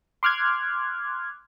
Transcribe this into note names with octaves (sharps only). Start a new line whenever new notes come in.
C6 D6 F6 F#6 G#6